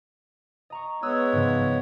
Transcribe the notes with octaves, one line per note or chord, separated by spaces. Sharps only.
D#5 A#5 C#6
G#3 B3 C#5 D#6 E6 F#6
G#2 C#3 F3